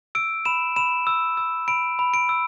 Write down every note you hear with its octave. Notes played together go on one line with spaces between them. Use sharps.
E6 D7
B5 E7
B5 E7
E6
E6
B5 D7
B5
D7
E6